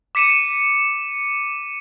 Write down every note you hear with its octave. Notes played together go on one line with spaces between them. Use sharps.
D6 B6 C#7 D#7 E7